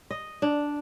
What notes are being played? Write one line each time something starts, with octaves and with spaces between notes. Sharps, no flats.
D#5
D4